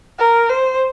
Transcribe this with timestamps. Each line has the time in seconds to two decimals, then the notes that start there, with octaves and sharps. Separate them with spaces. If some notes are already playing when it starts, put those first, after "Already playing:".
0.19 A#4
0.50 C5